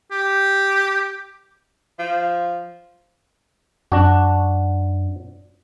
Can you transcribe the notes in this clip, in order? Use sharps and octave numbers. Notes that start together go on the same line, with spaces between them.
G4
F3
F#2 D4 F#4